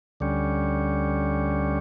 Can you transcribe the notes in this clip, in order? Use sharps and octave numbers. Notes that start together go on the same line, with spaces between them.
D2 D3 G3 C#4